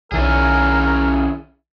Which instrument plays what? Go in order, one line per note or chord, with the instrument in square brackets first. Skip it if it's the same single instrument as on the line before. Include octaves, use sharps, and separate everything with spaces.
[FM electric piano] B1 D#3 A6 [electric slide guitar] C#4 E4 G#4 [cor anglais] A#4